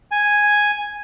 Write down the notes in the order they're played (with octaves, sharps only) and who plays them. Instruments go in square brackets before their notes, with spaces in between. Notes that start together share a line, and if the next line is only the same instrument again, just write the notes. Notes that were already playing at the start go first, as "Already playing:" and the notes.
[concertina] G#5